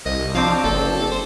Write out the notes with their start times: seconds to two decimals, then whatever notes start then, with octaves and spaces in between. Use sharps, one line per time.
0.06 C2 D#5
0.35 F3 F#3 C4 D4 F5
0.64 F#1 A4
1.11 C5